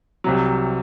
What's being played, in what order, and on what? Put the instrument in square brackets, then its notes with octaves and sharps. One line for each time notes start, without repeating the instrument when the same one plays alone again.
[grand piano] C2 C3 F#3